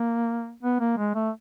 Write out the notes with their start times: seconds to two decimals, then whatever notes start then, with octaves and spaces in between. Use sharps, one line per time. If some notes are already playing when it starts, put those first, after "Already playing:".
Already playing: A#3
0.63 B3
0.80 A#3
0.98 G#3
1.15 A3